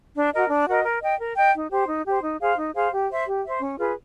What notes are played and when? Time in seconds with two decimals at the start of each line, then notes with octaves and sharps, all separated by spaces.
0.15 D4
0.33 F#4 A#4 D#5
0.50 D4
0.68 F#4 A#4 D#5
0.85 A#4
1.02 D#5 G5
1.19 A#4
1.36 D#5 G5
1.54 D#4
1.71 G4 C5
1.88 D#4
2.06 G4 C5
2.23 D#4
2.40 G#4 C5 F5
2.58 D#4
2.75 G#4 C5 F5
2.92 G4
3.10 C5 E5
3.27 G4
3.44 C5 E5
3.61 C#4
3.78 F4 G#4 B4